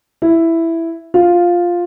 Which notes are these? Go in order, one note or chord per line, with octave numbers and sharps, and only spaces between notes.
E4
F4